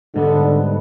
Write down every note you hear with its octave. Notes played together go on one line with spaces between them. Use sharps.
G#2 D3 G3 B3